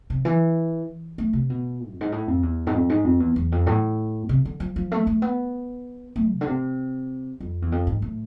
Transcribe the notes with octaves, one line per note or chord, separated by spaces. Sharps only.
C3
E3
A3
C3
B2
F2
G#2
A2
F2
E2
G#2
F2
G#2
F2
E2
E2
F2
A2
C3
D3
F3
F3
A3
A3
B3
A3
C3
D3
C3
F2
E2
F2
G#2
A2